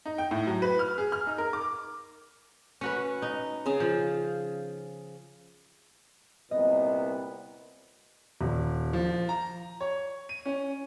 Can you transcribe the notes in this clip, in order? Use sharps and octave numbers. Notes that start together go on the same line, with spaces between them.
D#4
G5
A2
F#3
B4
F6
G#4
F6
D#4
A#4
D6
C#4 F#4 B4
D#4
C#3 G#4 F5
F3
C2 A#2 B3 D#5
D#1
F3
A#5
C#5
D#7
C#4